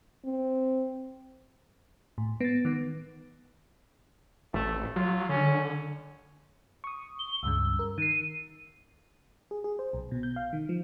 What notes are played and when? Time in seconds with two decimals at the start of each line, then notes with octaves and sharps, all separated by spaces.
0.25 C4
2.18 A2
2.40 B3 A6
2.65 D#3 B3
4.54 A1 A3
4.96 F#3 F4
5.29 D3 C#4
6.84 C#6 D#6
7.19 G7
7.43 C#2 G2 C#3 E6
7.79 A#4
7.98 D#3 C7 D#7
9.51 G#4
9.64 G#4
9.79 C5
9.93 B1
10.12 B2
10.23 G6
10.36 F5
10.53 D#3
10.69 F3